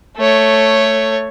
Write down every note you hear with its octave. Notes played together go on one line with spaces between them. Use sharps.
A3 C#5